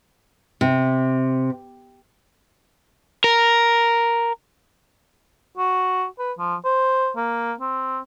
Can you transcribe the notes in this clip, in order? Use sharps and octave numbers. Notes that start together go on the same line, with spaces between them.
C3
A#4
F#4
B4
F3
C5
A#3
C4